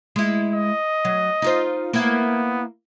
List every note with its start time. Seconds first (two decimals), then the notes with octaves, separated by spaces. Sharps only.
0.16 G#3 E4
0.54 D#5
1.05 F#3
1.42 D#4 F4 C5
1.93 A#3 B3 E4